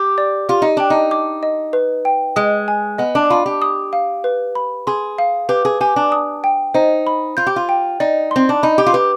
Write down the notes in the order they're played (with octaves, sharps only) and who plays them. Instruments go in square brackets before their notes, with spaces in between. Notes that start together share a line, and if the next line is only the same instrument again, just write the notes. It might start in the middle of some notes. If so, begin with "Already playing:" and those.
Already playing: [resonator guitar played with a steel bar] G4
[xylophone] D5
[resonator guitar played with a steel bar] F4 [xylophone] G4
[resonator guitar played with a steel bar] D#4
[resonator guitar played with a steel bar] D4 [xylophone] G5
[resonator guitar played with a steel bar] D#4
[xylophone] D6
D#5
B4
G5
[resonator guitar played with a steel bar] G#3 [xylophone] D#6
[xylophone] G#5
[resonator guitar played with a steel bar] B3 [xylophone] D#5
[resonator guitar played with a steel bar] D4
[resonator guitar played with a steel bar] F4 [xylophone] B5
[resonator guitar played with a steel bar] G4
[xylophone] D#6
F5
B4
B5
[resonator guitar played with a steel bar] G#4 [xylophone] C6
[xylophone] F5
[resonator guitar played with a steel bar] G4 [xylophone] B4
[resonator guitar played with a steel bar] G#4
[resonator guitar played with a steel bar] G4 [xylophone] G#5
[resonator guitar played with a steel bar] D4
[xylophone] D#6
G5
[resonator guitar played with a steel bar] D#4 [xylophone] C5
[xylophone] B5
[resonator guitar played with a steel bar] F4 [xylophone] G6
[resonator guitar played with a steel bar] G4
F4
[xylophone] G5
[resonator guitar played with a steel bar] D#4 [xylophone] D5
[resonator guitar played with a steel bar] C4 [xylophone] C6
[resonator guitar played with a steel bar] D4
[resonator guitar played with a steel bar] D#4 [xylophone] B5
[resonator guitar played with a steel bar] G4
F4
[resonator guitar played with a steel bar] G4 [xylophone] B4